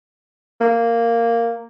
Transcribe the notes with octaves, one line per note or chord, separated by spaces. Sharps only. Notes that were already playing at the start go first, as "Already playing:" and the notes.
A#3